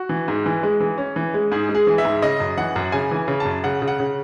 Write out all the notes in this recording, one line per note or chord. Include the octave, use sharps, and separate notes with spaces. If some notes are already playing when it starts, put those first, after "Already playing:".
Already playing: F#4
E3
G#2
E3
G#3
E3
C#4
E3
G#3
G#2 G#4
G#3
G#4
E3
E5
G#2
C#3 D#5
F#2
E3 F#5
F#2
C#3 G#5
E3
C#3
A5
F#2
C#3 F#5
C#3
F#5
C#3